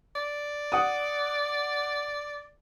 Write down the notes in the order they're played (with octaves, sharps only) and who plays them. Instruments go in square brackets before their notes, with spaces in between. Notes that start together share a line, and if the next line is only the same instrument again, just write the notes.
[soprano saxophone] D5
[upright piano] F#5 D#6